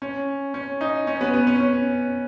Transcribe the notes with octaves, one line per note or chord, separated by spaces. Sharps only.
C#4
C#4
D#4
C#4
B3
B3
C#4
C#4